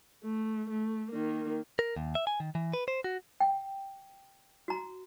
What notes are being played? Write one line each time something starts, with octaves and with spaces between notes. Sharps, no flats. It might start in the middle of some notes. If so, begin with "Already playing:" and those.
A3
A3
D#3 A#3
A#4
D#2
E5
G#5
D#3
E3
B4
C5
F#4
G5
F#4 A#5